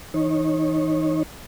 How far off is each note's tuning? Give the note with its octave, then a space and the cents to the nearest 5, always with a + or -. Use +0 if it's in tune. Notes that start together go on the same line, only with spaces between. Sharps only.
E3 -25 D#4 +0 C#5 -25